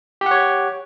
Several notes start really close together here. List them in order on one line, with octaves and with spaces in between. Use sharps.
G4 F#5 C#5